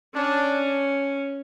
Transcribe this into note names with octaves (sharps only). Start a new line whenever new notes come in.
C#4 D4